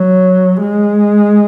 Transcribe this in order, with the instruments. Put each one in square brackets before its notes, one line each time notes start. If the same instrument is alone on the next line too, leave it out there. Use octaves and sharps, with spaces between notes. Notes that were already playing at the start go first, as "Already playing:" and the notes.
Already playing: [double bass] F#3
G#3